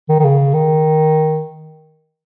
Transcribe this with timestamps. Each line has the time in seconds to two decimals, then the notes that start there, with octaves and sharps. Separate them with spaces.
0.09 D#3
0.20 D#3
0.24 C#3
0.54 D#3